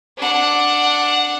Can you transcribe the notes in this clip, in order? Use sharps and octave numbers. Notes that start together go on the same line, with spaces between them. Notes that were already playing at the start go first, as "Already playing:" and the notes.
D4 F#5